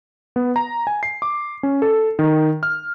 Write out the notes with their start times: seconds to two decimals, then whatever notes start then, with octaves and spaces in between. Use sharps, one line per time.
0.36 B3
0.56 A#5
0.87 G#5
1.03 C7
1.22 D6
1.63 C#4
1.82 A4
2.19 D#3
2.63 F6